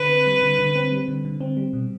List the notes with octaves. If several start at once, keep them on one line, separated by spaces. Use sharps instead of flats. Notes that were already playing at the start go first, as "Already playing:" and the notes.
Already playing: D3 B4
C4
G3
D3
D3
C4
G3
D3
D3
C4
G3
B2